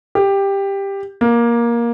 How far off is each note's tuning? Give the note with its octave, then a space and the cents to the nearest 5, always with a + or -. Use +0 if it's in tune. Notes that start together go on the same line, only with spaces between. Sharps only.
G4 +10
A#3 +15